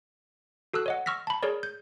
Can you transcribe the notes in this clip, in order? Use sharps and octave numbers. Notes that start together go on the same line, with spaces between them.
F#4 A4 D#6 E6 F#6
C#5 D#5 F#5
C#6 E6 F6 A#6 B6
A5 B5
G#4 A#4 C#5 D5
G6